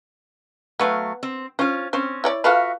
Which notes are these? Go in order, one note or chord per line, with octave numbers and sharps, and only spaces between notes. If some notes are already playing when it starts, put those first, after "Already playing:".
F#3 A3 B3 F5
C4
C#4 F4 C5
C4 C#4 C5
E4 C#5 D5
F4 F#4 A4 B4 E5 F5